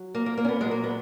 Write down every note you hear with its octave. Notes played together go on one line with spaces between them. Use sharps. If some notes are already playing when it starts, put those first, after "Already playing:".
Already playing: F#3
A#3
A#3
A#3
C#4
B3
A#2 F#3 G#3
A#3
B3